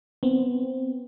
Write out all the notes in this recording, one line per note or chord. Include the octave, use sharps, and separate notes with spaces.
B3 C4